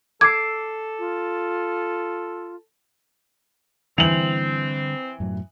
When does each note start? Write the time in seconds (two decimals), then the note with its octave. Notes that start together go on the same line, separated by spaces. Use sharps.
0.21 A4 D6 E6 G#6 C7
0.99 F4
3.98 D3 E3 G3 C4 F7 F#7
5.20 F#2 A2 F#3